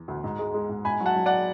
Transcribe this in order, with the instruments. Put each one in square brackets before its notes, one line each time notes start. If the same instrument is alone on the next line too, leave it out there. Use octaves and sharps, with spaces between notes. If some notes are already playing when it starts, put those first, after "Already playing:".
Already playing: [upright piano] E2
D2
G#2
G#3
G#3
G#2
G#2 G#5 B5
F#3
F#5 A5
F#3
D5 F#5